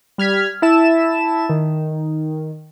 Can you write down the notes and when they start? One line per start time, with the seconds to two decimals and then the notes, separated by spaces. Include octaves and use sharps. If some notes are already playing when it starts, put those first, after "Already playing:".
0.18 G3 F6 G#6 B6
0.62 E4 E5 A5 E7
1.49 D#3